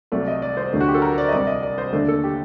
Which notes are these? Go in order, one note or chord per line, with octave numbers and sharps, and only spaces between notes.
C2 C3 F#3 A3 D5
D#5
D5
C5
D2 D3 A3
F#4
G4
A4
A#4
D5
D#5
C2 C3 G3 D5
D#5
D5
C5
D#2 D3 A3 D5
A4
G4